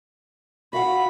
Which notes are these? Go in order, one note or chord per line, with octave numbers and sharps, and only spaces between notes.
F#4 F5 F#5 B5